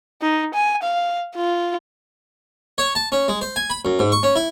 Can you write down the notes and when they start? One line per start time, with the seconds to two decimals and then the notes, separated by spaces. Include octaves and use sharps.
0.22 D#4
0.54 G#5
0.83 F5
1.36 F4
2.78 C#5
2.95 A5
3.12 C#4
3.28 G#3
3.41 C5
3.56 G#5
3.70 B5
3.85 F#2
3.99 G#2
4.12 C#6
4.23 C#4
4.36 E4